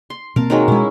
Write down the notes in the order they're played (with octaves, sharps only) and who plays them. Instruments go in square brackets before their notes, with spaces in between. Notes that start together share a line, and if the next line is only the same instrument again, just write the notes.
[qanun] C6
[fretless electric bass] B2 A#3 C4 [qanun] A#4 A5
[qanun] D#3 F#3 G#3
[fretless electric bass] B2 G#3 [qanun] C#4 E4